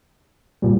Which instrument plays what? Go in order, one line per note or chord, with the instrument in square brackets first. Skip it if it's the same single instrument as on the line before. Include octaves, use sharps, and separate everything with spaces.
[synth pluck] A#2 G3